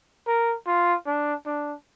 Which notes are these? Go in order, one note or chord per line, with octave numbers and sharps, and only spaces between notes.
A#4
F4
D4
D4